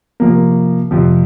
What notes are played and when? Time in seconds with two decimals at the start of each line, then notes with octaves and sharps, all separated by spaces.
0.20 C3 F3 A#3
0.91 F2 C3 F3